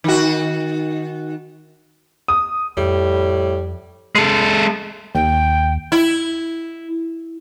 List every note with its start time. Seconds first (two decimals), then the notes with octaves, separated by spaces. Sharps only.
0.04 D#3 F#4
2.28 D#6
2.77 F2 A2 G3
4.15 G#3 A4
5.15 D#2 G5
5.92 E4